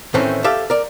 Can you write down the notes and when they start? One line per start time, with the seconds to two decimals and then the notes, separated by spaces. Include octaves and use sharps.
0.14 A2 D#3 E3 A3 C4 C#4
0.44 G4 A4 E5 F5
0.70 A#4 D5